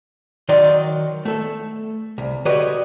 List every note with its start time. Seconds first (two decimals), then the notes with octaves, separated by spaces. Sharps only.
0.49 D#3 F#3 D5 D#5 C6
1.25 A3 A4
2.18 C2
2.45 D3 F#4 G4 B4 C#5 D#5